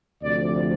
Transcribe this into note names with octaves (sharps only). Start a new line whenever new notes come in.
D2 C3 F3 D5